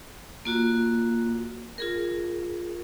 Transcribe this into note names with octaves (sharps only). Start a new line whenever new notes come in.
A#3 F4 F#4
F4 G#4 A#4